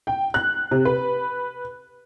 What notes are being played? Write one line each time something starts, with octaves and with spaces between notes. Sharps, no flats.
G5
F#6
C3
B4